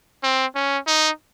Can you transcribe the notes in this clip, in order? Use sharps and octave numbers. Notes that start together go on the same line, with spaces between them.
C4
C#4
D#4